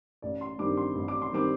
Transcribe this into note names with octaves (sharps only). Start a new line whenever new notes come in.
A1 D5
C6
G2 D#3 G3 C4 D6
C6
A1
D6
C6
D#3 G3 C4 D6